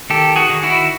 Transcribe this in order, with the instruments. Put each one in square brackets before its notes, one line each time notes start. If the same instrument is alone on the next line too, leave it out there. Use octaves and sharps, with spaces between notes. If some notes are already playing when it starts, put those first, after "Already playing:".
[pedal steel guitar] D#3 G4 A4
F#4 G#4
D#3
E4 F#4